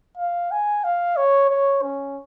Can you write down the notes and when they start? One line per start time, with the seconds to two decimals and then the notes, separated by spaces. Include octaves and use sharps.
0.17 F5
0.51 G#5
0.84 F5
1.17 C#5
1.50 C#5
1.83 C#4